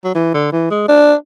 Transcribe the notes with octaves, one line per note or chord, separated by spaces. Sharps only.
F#3
E3
D3
E3
G#3
D4